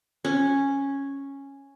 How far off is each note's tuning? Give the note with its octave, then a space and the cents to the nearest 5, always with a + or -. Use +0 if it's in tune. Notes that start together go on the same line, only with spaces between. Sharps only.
C#4 -5